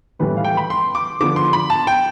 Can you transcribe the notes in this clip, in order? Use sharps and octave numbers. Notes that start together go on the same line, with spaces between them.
A2 E3 G3 B3 B4
F5
G5
B5
C6
D6
D3 F3 B3 D6
C6
B5
A5
G5